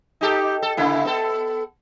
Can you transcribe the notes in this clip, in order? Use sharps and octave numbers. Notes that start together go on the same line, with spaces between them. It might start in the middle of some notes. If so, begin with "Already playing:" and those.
D#4 G4 A4
A4
C#3 A#3 E4
B3 A4